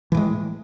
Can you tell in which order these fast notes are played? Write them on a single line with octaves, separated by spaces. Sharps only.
E3 A2 G#3